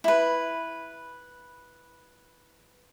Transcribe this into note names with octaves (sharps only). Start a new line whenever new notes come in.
E4 B4